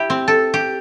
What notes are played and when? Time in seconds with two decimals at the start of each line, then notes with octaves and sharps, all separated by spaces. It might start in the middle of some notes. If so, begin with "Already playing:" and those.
Already playing: E4 G4
0.10 C4
0.28 A4
0.54 G4